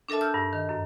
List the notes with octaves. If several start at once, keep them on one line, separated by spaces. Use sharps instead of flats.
D4 A4 A#4 E5 A5
E6 F6 G6
G2
D#3
F#2